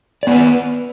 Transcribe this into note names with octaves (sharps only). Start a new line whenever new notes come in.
B3 B4 D5